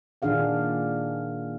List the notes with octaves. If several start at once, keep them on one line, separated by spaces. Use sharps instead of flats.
A#2 D#3 D4 G#4 F5 F#5